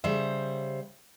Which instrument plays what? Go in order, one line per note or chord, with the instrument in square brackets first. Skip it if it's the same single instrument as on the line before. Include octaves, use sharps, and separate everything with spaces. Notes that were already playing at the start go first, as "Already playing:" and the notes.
[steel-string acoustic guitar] C#3 G3 C5 E5